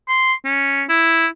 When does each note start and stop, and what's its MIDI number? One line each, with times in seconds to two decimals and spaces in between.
0.09 0.34 84
0.45 0.84 61
0.89 1.27 64